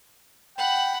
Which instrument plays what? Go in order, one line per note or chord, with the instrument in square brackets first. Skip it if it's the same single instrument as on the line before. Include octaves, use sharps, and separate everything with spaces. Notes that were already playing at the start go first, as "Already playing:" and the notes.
[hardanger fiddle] F#5 B5 [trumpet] G5